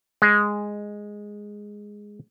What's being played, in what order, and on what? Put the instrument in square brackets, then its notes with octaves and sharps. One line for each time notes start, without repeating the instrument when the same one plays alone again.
[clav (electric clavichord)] G#3